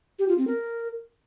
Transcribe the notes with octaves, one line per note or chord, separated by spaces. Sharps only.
G4
F4
C4
A#4